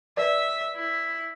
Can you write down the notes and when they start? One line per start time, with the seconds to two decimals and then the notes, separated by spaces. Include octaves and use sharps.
0.17 B4 D5 E5
0.76 E4